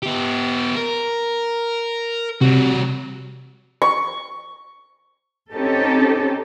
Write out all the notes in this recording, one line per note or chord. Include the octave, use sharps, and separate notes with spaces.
B3 G4
A#4
C3 G3 F#4
C#6
C4 C#4 D#4 G4 A4